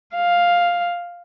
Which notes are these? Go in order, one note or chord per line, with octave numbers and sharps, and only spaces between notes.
F5